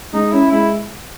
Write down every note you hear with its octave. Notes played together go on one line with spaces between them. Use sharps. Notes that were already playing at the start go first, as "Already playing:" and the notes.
G#3 D#4
C#4 E4
G#3 E4